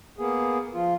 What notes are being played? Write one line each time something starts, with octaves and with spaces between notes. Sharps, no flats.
A#3 B3 G#4
F3 F4